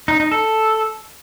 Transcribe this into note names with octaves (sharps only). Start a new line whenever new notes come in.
D#4
D#4
A4